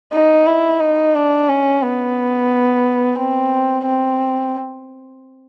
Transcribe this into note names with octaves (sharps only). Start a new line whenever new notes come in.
D#4
E4
D#4
D4
C#4
B3
C4
C4